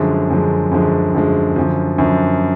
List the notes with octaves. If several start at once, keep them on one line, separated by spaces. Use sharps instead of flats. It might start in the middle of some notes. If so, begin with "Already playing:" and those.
Already playing: F#2 D3 F3 G#3
F#2 D3 F3 G#3
F#2 D3 F3 G#3
F#2 D3 F3 G#3
F#2 D3 F3
F#2 D3 F3